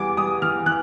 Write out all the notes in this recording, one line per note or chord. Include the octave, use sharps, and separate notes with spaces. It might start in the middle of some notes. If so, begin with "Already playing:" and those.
Already playing: E2 E3 G3 G#5 D6
G3 D#6
E3 F6
E3 F#6